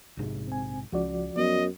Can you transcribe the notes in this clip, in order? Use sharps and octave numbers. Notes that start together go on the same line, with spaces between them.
A#1 G#2 C3
C4 G#5
C#2 F3 C#4 F#4 D5
F#2 B3 D#5